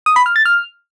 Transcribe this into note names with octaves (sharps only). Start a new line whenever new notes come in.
D#6
B5
F6
A6
F6